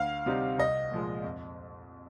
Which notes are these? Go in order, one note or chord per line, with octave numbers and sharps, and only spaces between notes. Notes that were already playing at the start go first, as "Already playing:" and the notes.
Already playing: D2 F5
C3 G3 C4 D#4
C2 D#5
A#2 F3 G#3
F2